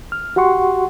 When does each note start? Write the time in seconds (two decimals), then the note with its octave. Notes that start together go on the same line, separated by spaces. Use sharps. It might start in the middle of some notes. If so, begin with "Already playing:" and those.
0.12 F6
0.36 F#4 G4 F#5 C6 C#6